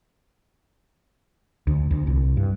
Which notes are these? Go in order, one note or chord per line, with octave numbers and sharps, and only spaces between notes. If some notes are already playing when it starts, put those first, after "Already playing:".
D2
D2
C2
G2